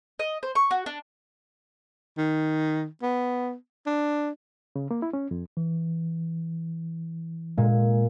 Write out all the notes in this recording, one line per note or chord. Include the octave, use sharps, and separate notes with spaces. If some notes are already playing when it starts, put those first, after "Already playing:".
D#5
C5
C#6
F#4
D4
D#3
B3
D4
C#3
A#3
E4
C#4
F2
E3
A#2 G#3